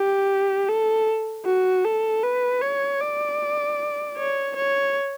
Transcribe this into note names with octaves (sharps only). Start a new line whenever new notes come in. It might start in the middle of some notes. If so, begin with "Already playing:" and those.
Already playing: G4
A4
F#4
A4
B4
C#5
D5
C#5
C#5